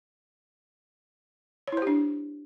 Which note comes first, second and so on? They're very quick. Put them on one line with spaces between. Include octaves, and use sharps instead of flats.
C#5 E4 C5 G4 D4